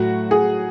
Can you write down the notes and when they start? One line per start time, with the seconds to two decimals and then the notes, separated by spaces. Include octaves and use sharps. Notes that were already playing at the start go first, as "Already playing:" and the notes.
Already playing: A2 F#3 A3 F#4
0.31 G#4